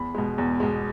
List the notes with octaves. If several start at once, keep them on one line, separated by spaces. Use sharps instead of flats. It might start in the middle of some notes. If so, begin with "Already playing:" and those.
Already playing: E2 B5
B2 G#3
E2
B2 G#3